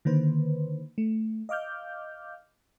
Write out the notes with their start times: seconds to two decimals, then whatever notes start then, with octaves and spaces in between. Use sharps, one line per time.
0.05 D3 D#3 A#3 B4 C5
0.98 A3
1.49 D#5 F5 D6 F6 G6